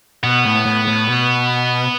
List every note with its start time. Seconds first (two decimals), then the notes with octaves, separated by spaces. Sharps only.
0.23 B2 B3
0.45 A2
0.66 A2
0.87 A2
1.08 B2